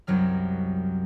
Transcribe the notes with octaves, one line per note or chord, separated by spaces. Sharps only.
C2 F#2 F#3 F6